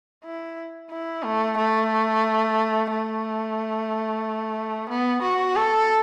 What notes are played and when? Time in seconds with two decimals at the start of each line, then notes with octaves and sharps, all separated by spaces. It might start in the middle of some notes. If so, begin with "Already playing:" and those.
0.25 E4
0.91 E4
1.24 A3
1.57 A3
2.91 A3
4.90 B3
5.23 F#4
5.56 A4